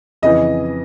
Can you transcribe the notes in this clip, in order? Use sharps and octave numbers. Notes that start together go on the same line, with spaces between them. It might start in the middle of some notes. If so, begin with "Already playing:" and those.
F2 C#3 E3 D#5